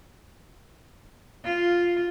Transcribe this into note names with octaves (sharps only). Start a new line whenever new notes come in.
F4